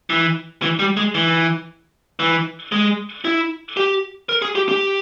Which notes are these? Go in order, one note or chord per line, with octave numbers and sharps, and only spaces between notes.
E3
E3
G3
G#3
E3
E3
G#3
E4
G4
A#4
G#4
G4
G4